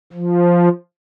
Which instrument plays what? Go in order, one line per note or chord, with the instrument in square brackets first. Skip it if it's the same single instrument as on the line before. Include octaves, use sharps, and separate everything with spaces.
[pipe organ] F3